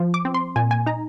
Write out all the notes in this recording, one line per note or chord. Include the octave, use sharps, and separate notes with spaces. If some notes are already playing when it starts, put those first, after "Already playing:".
Already playing: F3
D6
C4
C6
A#2 G#5
G#5
D#4 A#5